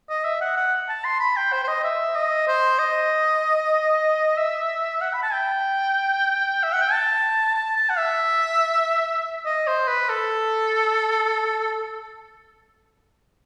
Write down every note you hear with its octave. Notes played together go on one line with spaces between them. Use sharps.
D#5
E5
F#5
F#5
A5
C6
B5
G5
C5
C5
D#5
E5
D#5
C5
D#5
E5
F#5
B5
A5
G5
E5
F#5
G5
A5
A5
A5
F#5
E5
D#5
C5
B4
A4